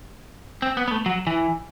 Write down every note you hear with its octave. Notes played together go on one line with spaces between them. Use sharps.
C4
B3
B3
A3
F#3
E3